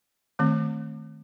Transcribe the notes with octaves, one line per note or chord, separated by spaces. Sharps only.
D#3 A3 C4